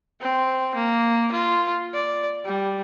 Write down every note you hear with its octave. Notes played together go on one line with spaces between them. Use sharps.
C4
A#3
F4
D5
G3